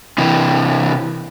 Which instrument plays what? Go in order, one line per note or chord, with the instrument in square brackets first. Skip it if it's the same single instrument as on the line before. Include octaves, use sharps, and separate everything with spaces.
[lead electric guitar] C3 E3